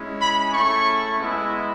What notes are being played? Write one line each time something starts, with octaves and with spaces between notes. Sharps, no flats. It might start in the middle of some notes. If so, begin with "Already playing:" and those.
Already playing: G#3 C#4 E4
B5
A3 C#4 E4 C#6
G#3 B3 E4